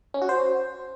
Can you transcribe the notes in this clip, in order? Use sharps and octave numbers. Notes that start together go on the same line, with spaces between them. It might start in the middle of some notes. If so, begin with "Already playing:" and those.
C#4
F#4
C5